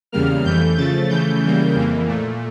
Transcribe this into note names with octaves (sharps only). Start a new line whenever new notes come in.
E2 C#3 G3 A#3 F6
F2 E3 A3 G6
C#3 F3 A3 A6
C#3 E3 A3 G6
C#3 E3 G3 A#3
F2 E3 A#3
A#2 A3